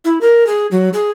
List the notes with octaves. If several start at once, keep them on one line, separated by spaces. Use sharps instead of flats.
E4
A#4
G#4
F#3
G#4